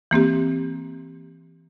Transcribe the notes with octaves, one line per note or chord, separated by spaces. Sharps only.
E3 A#3 C4 G4